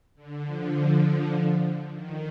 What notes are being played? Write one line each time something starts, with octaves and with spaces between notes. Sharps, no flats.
D3
D3 F3
D#3